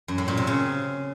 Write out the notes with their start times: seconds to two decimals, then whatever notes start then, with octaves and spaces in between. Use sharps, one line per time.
0.08 F#2
0.18 A2
0.28 A#2
0.37 C3
0.47 C#3